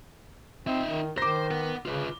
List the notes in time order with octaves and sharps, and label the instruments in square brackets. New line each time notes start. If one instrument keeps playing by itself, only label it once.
[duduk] C4 [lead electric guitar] D#4 E5
[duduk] D#3
[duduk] D#3 [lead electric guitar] C5 [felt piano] D6 A#6
[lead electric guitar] B3 B4
[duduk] C#3 [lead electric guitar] F4 B4